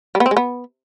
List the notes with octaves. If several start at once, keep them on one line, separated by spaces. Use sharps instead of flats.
G3
B3
C4
G#3
B3